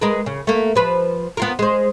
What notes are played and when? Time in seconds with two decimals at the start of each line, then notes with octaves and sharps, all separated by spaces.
0.01 G#3 A#4 B4
0.26 C#3
0.47 A3 A#3
0.75 F3 B4
1.37 B3 F4 A#4
1.59 G#3 C5